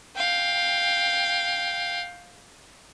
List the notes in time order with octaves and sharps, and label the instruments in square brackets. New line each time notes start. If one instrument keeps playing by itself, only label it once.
[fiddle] F5 G5